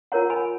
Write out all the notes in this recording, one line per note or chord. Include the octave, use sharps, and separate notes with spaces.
F4 A#4 C#5 F#5 A#5
G#5 B5